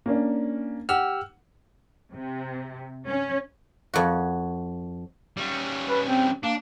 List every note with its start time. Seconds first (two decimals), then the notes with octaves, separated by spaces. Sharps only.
0.06 A#3 C#4 D4
0.89 G4 F#5 E6 F6
2.14 C3
3.09 C#4
3.94 F2 F#4
5.37 G3 C#4
5.89 B4
6.06 C4
6.43 A#3 D4